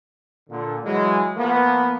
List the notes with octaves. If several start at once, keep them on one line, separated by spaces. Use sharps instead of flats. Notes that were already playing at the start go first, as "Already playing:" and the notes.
A#2 D3
E3 F#3 G#3
F3 A#3 B3